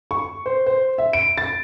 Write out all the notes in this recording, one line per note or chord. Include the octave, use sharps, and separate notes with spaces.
C#6
C5
C5
E5
D7
A6